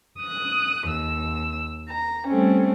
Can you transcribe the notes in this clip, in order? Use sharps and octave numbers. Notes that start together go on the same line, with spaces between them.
D#6 F#6
D#2 E6
A#5
G3 A3 C4 C#4